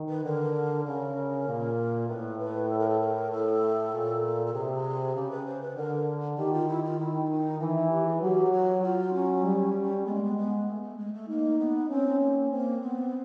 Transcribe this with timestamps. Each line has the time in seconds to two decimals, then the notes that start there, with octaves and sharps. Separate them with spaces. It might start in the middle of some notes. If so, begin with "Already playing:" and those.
Already playing: D#3
0.09 B4
0.24 D3 A#4
0.86 C#3 A#4
1.47 A#2
2.09 A2 B4
2.40 B4
2.70 A4
2.79 A#4
2.89 A4
3.01 A#4
3.31 A2 A4
3.93 A#2
4.46 A4
4.54 C3 G#4
5.15 C#3 G4
5.31 B4
5.46 C5
5.61 B4
5.76 D3 A#4
6.38 D#3 G4
6.53 F4
6.69 E4
6.84 F4
6.99 D#3 E4
7.25 E4
7.30 D#4
7.60 E3 D#4
7.77 D#4
7.91 G4
8.07 G#4
8.22 F#3 G4
8.52 F#4
8.83 F#3 F4
9.14 C#4
9.44 G3
10.06 G#3 B3
10.15 A#3
10.24 B3
10.37 B3
10.67 A3
10.83 A3
10.98 G#3
11.14 A3
11.29 A#3 D#4
11.59 B3
11.90 C4 C#4
12.21 A#3
12.51 A#3 C4
12.82 B3